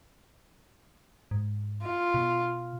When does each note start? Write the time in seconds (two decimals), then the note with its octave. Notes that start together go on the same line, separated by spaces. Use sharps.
1.31 G#2
1.83 F4
2.14 B2